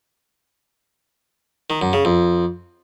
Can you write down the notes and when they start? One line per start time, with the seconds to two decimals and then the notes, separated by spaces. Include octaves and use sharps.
1.70 D#3
1.82 F#2
1.93 C#3
2.05 F2